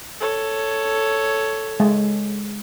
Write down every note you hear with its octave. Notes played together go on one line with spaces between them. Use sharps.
A4 C#5
G#3